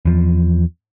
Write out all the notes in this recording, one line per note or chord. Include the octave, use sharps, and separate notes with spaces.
E2 F3